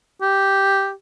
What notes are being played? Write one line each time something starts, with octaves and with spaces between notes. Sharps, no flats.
G4